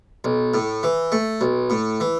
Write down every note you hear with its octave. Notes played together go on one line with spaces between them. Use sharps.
B1
A2
E3
A3
B1
A2
E3